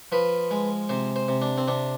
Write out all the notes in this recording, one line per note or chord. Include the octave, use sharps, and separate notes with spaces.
F3 B4
G#3
C3 C5
C5
C3
D4
C4
C3 D4